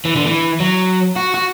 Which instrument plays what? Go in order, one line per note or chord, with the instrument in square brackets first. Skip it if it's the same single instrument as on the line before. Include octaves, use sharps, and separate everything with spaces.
[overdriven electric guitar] E3
D3
E3
F#3
F#4
F#4